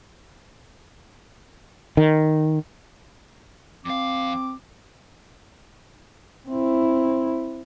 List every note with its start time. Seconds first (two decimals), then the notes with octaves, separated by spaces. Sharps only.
1.97 D#3
3.85 F2 C4 F5 D6
6.49 C4 E4